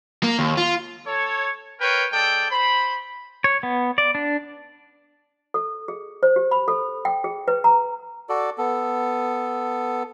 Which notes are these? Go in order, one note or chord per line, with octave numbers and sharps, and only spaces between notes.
A#3
D#2
F4
A4 C#5
A#4 B4 C#5 G5
G#3 A4 D5 G5
C5 B5
C#5
B3
D5
D4
A4
G#4
C5
G4
B5
A4
G5
G#4
B4
A#5
F#4 A4 D5
B3 A4